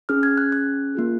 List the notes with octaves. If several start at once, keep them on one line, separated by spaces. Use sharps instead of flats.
C#4 G#4 F6
G#6
F#6
F#6
A#3 F4 G#4